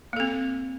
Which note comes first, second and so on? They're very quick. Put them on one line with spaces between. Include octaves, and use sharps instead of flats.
A#3 A4 C4